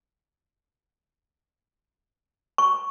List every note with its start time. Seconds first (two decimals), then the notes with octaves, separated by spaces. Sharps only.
2.58 C#6